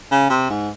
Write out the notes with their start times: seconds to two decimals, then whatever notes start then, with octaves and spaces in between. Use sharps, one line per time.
0.12 C#3
0.30 C3
0.50 G#2